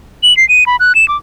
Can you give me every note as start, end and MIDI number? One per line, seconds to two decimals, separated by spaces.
0.23 0.36 102
0.37 0.47 96
0.49 0.64 99
0.66 0.76 83
0.80 0.95 90
0.95 1.08 100
1.08 1.17 86